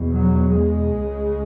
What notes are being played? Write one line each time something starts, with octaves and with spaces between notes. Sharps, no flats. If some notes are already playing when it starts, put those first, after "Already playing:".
Already playing: E2 B2
F#3
G#3
C#2 C#3